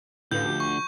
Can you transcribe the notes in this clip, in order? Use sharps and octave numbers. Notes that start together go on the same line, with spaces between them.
D2 A2 B4 F5 G6
F3 G4
C#6